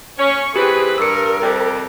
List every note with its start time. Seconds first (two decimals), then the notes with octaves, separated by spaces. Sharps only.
0.18 C#4 C#6
0.56 E3 C4 G4 G#4 B4
0.98 G2 A#4 E6 C#7
1.41 F2 C3 G3